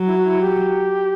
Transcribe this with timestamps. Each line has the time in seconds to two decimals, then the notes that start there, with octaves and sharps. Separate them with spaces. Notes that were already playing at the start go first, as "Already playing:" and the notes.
Already playing: F#3
0.08 E4
0.17 F#4
0.25 E4
0.42 G4